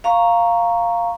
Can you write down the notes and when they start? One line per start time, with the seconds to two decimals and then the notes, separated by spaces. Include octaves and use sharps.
0.04 F5 A#5 C#6